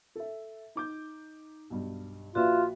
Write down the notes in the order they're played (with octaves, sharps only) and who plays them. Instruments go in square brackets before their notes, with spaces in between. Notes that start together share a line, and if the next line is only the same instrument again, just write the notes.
[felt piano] A4 E5
D#4 D6 G6
B1 G2
[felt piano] A#1 B4 D5 [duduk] F4 [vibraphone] F#4 E5 F5